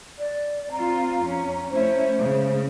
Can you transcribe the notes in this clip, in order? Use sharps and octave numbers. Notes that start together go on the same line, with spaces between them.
D5
C4 F4 A#5
F2 C#4
A3 C#4 E4 C5
C#3 G#3